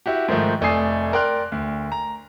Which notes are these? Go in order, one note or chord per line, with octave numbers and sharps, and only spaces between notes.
E4 F#4 G4
G#2 D#3 F3 A3
F1 A3 D5 G#5 D#6 C7
A#4 D5 G5 C6 F6 F#6
D2
A#5